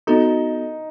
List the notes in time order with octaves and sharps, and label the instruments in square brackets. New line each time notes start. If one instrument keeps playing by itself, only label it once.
[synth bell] B3 F#4 A4 [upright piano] D#4